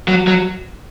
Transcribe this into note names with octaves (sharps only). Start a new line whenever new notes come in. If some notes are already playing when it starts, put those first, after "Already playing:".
F#3
F#3